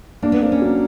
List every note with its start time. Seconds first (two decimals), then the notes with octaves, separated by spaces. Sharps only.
0.22 A#3 D4
0.32 B3
0.42 A#3 C4
0.52 C#4
0.61 F#3